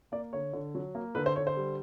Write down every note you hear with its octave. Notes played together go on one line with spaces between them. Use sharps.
A#3 D5
D3 C#5
D3
F#3
A#3
D3 B4
C5
D3 C#5
C5
G3